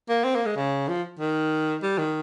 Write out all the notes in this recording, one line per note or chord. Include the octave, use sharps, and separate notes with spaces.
A#3
C4
A#3
G#3
C#3
F3
D#3
G3
D#3